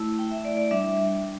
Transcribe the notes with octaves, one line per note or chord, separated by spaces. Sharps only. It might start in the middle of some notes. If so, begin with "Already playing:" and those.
Already playing: A3 E4
G5
E5
D5
D5
G3 D4 E5